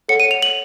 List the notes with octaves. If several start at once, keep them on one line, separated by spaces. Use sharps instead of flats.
A4 C#5 F#5 C#7
D#7
F7
F#7